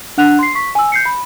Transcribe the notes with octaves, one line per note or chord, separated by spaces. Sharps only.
D4 F#5 F#6 F7
C6 C7
C#6 B6
G#5 E6
G6 C7 C#7
B5